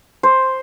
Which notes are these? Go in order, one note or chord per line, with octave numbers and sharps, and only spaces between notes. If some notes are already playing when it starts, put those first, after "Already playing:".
C5